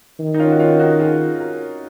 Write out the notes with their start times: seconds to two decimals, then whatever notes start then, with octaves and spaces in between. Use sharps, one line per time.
0.20 D#3
0.34 D#4
0.40 C#4 F4
0.52 F#4
0.60 C#4 F4
0.80 D#4 F#4
1.00 F4 G#4
1.40 F#4 A#4